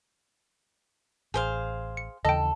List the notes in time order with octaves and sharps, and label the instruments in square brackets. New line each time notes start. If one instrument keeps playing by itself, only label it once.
[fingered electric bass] A1 [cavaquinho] G#4 C5 F5
[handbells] C#7
[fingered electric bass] D#2 C#3 E3 [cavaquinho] A4 [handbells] D#5 G5